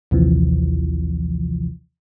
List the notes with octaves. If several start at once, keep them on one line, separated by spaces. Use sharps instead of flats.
A#1 D#2 C3 E3 F3